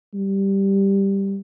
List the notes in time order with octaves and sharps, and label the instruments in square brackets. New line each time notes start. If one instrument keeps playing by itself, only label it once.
[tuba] G3